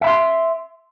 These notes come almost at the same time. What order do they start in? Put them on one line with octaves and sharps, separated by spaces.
E5 B5 C6